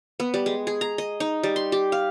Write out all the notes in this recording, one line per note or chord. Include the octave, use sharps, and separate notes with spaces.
B3
G3
G#3
G#4
A#5
D#5
D#4
G3
C6
G4
F5